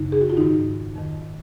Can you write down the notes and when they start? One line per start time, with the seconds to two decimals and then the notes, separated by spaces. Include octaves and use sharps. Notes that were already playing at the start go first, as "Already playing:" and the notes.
Already playing: F#2 C#3 D#4
0.12 G#4
0.21 F#4
0.30 F4
0.37 G#2 D#3 D#4
0.96 F2 D#3